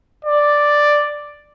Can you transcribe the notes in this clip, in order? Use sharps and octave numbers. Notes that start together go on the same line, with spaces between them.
D5